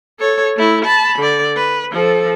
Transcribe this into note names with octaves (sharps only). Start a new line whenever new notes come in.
A4 C#5
A3 E4
A5 B5
D3 D5
B4
F3 A4